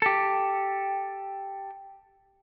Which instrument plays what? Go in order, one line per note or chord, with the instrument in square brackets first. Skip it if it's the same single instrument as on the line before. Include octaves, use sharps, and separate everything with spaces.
[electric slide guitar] G4 A4